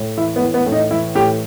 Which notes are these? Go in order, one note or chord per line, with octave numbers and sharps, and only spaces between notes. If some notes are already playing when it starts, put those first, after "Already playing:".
Already playing: A2
E3 E4
B3
E3
B3
A2
D#4
E3 E4
A2 G4